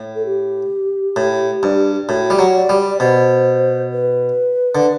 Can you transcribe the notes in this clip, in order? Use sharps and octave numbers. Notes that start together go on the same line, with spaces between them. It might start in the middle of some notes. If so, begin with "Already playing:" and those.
Already playing: A2
A4
G4
A2
G2
A2 F#4
G3
F#3
D5
G3
D5
B2 C5
B4
D3